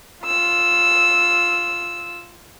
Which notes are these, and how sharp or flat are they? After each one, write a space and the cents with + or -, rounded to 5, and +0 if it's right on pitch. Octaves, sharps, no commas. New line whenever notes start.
F4 +0 E6 +0